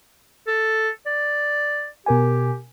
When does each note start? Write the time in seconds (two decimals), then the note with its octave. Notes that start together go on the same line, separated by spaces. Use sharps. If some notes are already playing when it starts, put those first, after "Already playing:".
0.47 A4
1.06 D5
2.06 B2 G4 A#4 G#5